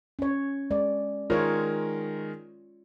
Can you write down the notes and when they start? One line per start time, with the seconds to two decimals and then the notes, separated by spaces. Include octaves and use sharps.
0.19 C#4 C#5
0.71 G#3 D5
1.30 D#3 G#3 F4 A#4 C#5